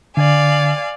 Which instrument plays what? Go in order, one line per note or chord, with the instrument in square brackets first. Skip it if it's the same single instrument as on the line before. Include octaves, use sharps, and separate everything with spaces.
[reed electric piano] D3 [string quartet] D5 F5 G#5